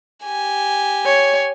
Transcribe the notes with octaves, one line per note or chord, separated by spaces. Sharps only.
G4 G#5
C#5